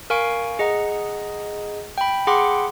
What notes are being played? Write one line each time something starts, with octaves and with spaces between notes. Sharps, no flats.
A#4 F5 G#5 C#6 D7
G#4 D#5 F#5 A#5
G5 B5
G#4 F#5 G5 B5 C6 D6